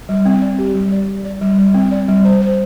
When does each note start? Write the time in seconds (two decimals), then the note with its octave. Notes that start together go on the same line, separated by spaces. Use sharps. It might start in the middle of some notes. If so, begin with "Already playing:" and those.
0.09 G3
0.26 C4
0.42 D5
0.59 G4
0.75 G3
0.92 D5
1.08 G4
1.25 D5
1.42 G3
1.58 G3
1.74 C4
1.92 D5
2.08 G3
2.25 C5
2.42 C5